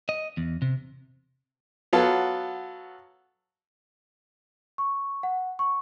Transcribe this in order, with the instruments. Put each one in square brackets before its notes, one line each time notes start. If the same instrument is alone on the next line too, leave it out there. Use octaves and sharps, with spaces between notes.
[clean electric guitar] D#5
E2
C3
[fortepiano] F#3 B3 F4 A4
[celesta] C#6
F#5
C#6